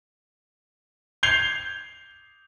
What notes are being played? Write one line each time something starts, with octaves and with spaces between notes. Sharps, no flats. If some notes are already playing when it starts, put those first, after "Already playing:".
G6 G#6 C7 F7 G7